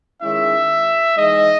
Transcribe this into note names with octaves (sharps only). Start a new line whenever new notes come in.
D#3 G#3 C#4 E4 E5
E3 G#3 D#4 D#5